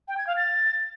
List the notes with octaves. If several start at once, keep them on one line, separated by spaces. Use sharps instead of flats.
G5
G#6
F5
A6